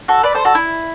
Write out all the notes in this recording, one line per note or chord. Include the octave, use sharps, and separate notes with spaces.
F#4 A4
B4 D5
A4 C5
F#4 A4
E4